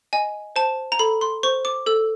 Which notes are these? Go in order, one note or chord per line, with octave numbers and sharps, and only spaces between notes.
D#5 G#5
C5 A5
A#5
A4 B5
C6
C5 C#6
D6
A4 E6